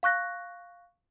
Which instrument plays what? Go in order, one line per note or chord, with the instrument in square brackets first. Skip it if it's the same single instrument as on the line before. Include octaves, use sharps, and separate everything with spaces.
[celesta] F5 C#6 F#6 A#6